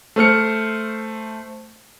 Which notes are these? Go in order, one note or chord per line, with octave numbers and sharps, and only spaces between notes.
A3 C5 F6 C#7